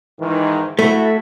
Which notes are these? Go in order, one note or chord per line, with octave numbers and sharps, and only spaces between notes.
G#2 D#3 E3
A3 E4 F#4 A4